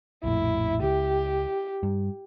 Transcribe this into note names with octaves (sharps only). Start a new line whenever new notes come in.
A#1 F2 A2 E4
C#2 G4
G2